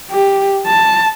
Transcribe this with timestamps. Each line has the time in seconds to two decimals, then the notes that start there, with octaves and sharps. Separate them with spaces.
0.10 G4
0.66 A5